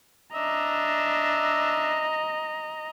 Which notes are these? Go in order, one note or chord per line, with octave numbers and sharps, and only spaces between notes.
D4 D#5 E5 A#5